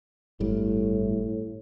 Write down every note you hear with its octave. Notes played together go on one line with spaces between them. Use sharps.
G1 A2 G3